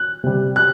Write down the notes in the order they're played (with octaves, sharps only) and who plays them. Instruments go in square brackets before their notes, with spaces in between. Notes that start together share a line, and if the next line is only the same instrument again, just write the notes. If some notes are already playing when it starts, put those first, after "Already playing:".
Already playing: [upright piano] F#6
C3 G3
F#6